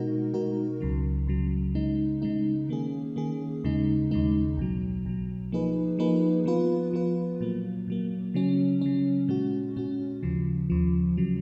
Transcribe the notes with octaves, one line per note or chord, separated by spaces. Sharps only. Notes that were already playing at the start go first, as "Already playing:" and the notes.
Already playing: B2 G#3 D#4 F#4 A#4
B2 G#3 D#4 F#4 A#4
C#2 C#3 F#3
C#2 C#3 F#3
C#3 G#3 D#4
C#3 G#3 D#4
D#3 A#3 C#4 G#4
D#3 A#3 C#4 G#4
D#2 C#3 G#3 D#4
D#2 C#3 G#3 D#4
B1 B2 F#3
B1 B2 F#3
F3 A#3 D#4 G#4 B4
F3 A#3 D#4 G#4 B4
F3 B3 F4 B4
F3 B3 F4 B4
A#2 F#3 A#3
A#2 F#3 A#3
C#3 F#3 C#4
C#3 F#3 C#4
A#2 G#3 C#4 F#4
A#2 G#3 C#4 F#4
D#2 C#3 F3
D#2 C#3 F3
C#3 F#3